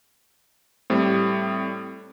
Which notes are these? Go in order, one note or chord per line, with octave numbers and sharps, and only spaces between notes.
A2 G3 C4